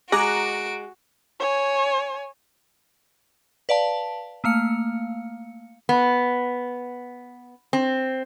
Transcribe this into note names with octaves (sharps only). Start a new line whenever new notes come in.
G#3 F#4 G#4 A#5 D6 F#6 D7
C#5 G#5
B4 D5 F5 A5
A3 A#3 F5 C#7
B3
C4